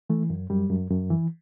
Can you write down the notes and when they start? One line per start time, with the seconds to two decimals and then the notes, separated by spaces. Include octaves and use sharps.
0.10 E3 A3
0.30 F#2
0.50 F#2 G3
0.70 F#2
0.91 F#2
1.10 E3